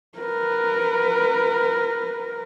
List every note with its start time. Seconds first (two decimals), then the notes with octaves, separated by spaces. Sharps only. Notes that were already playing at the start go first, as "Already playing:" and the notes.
0.18 A#4 B4